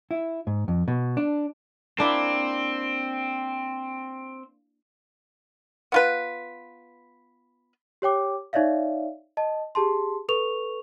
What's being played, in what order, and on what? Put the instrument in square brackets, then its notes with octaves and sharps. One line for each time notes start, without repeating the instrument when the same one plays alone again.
[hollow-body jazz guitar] E4
G#2
F2
B2
D4
[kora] A#3 D4 E4 [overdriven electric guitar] C4
[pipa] B3 F4 B4
[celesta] G4 C#5 G5 D6
D#4 C#5 D5 E5 F5
D#5 A5
G4 G#4 A5 C6
A4 B4 C#6 F7